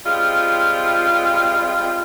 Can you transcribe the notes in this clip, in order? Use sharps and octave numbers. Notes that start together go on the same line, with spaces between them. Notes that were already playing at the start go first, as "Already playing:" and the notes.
G3 G#3 C4 F4